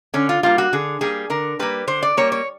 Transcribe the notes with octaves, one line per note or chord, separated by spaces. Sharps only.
D3 C#4
F4
G3 A#3 F4
F#4
D3 G#4
G3 A#3 G#4
D3 A#4
G3 A#3 B4
D3 C5
D5
G3 A#3 C#5
C#5